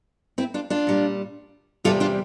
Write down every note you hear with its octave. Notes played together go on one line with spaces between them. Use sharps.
C4 E4
D4 F4
D4 F4
A#2 G3
E2 C3 G3 F4 A4
D4 F4